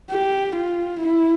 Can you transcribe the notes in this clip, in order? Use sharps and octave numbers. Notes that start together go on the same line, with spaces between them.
G4
F4
E4